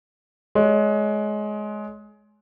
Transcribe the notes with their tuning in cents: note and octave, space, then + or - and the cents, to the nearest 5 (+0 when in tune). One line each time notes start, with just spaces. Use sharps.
G#3 +20 C#5 +30